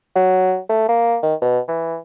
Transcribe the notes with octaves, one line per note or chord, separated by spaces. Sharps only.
F#3
A3
A#3
D#3
B2
E3